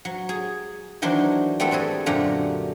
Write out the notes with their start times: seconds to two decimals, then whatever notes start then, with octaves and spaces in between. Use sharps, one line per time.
0.05 F#3
0.29 G#4
1.02 D#3 E3 F#3 D4 C5 C6
1.60 G3 A3 B3 C4 A4
1.71 C4 F#4 G#4 A4
2.06 F#2 A#2 D3 A3 G4 A#5